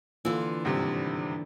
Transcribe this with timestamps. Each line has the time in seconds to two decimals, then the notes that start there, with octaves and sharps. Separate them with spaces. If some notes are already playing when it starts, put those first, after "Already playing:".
0.25 D3 E3 A#3 F4
0.65 G#1 G2 C3